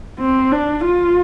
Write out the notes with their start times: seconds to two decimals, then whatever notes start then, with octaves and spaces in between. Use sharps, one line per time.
0.19 C4
0.52 D4
0.85 F4